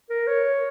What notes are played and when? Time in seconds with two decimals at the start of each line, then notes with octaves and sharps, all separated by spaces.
0.10 A#4
0.27 C#5